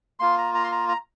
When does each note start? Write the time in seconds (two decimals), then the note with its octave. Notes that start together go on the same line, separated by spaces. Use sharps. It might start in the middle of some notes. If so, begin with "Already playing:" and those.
0.20 A#3 F4 C6
0.38 A#5
0.55 A#5
0.64 C6
0.72 A#5
0.89 A#5